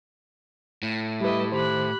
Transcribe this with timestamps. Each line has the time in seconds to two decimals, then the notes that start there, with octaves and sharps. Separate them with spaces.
0.83 A2
1.20 G3 E4 G4 B4 D#5
1.52 D#3 G4 C5 B5 F#6